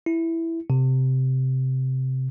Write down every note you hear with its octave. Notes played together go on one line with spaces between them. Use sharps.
E4
C3